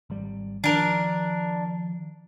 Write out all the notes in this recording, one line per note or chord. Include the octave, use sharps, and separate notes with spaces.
G#1 G3
D#3 F3 D4 A#4